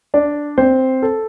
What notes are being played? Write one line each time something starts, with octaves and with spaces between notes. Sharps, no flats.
D4 D5
C4 C5
A4